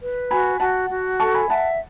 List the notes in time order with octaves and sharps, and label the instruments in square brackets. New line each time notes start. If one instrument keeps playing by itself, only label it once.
[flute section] B4
[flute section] F#4 [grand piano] G#5 B5
[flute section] F#4 [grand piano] F#5 A5
[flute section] F#4
[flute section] A4 [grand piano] A5 C#6
[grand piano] G#5 B5
[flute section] E5 [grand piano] F#5 A5